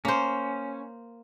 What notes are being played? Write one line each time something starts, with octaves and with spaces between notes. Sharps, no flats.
A#3 C#4 C5